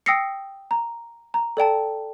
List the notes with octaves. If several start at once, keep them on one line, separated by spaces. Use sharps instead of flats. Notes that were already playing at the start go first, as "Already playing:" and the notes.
G5 D#6 E6 A#6 C7 C#7
A#5
A#5
A4 D5 G5 A5